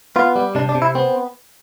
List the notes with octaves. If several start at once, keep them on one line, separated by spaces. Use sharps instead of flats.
B3 F4
G3
C3 D4
D4
C3
E4
B3 C4